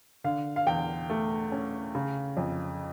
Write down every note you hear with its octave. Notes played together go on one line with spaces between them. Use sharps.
D3 F5
F5
E2 G5
A3
C#4
C#3
F2